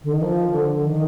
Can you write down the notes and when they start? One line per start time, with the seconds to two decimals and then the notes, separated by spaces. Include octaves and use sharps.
0.04 D3
0.12 D#3
0.22 F3
0.54 D3
0.85 D#3